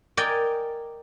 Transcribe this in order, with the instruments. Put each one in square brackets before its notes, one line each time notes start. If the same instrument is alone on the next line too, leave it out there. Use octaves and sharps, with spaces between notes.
[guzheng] A#4 D5 D#5 G5 G#5